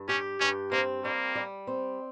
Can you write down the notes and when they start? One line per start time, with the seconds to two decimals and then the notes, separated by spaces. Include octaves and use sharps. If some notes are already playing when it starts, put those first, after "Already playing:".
Already playing: G2
0.08 C#4 G4
0.40 G2 C#4
0.72 A#3 C4
1.04 G3 A#3
1.35 G3
1.67 C4